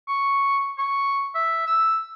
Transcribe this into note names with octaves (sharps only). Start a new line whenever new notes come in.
C#6
C#6
E5
E6